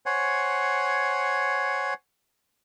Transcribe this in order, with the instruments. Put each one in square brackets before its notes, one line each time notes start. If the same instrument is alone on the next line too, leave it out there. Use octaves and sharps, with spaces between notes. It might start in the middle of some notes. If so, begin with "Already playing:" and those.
[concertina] C5 C#5 F#5 G#5